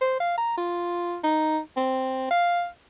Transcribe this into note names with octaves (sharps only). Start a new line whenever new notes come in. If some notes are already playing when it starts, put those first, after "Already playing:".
C5
F5
A#5
F4
D#4
C4
F5